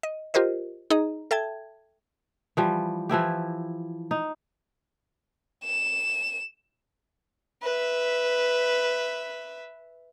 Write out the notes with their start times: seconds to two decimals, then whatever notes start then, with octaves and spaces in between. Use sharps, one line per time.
0.03 D#5
0.34 F4 G4 A#4 C5 D#5
0.90 D#4 G#4 D#5 A#5
1.31 A4 E5 G5 A5 G#6
2.57 E3 F3 G3
3.09 E3 F3 E4 G4
4.11 D#4
5.65 E7
7.63 B4 E5